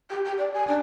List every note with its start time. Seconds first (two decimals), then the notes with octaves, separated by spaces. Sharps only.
0.10 G4
0.25 G4
0.38 D5
0.54 G#5
0.68 D4